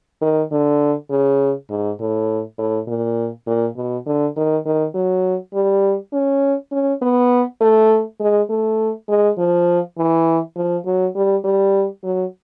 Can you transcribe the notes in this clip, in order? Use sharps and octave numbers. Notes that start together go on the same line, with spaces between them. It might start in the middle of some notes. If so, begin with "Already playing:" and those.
D#3
D3
C#3
G#2
A2
A2
A#2
A#2
B2
D3
D#3
D#3
F#3
G3
C#4
C#4
B3
A3
G#3
A3
G#3
F3
E3
F3
F#3
G3
G3
F#3